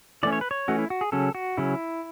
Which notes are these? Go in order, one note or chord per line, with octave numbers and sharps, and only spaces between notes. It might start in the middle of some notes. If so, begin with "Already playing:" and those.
E3 A3 C#4 D5
C#5
B4
C#5
E3 A3 C#4 F#4
E4
F#4
G#4
C#3 F#3 C#4 A4
F#4
C#3 F#3 C#4 E4